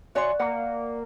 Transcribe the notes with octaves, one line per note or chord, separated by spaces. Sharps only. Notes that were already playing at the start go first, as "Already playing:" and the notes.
F#4 C#5 D5 E5 G#5 C6
A#3 D5 F#5